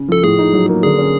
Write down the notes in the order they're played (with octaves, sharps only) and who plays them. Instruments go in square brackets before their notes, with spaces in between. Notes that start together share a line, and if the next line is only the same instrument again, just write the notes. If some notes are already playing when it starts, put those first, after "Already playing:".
Already playing: [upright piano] C#3
[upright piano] F3 [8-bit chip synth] A4
[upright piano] A2 [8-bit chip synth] G#4
[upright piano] D#4
F#3
A#3
[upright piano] D3 [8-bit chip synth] G#4
[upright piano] C#4